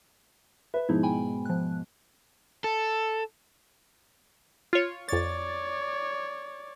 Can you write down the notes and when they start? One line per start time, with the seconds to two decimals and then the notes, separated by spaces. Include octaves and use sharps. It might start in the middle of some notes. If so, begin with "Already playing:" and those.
0.74 B4 E5
0.89 G#2 B2 F3 D#4 E4
1.03 G5 G#5 B5
1.45 F3 F#6
2.64 A4
4.73 F4 C#5
5.09 F2 C#5 D5 A6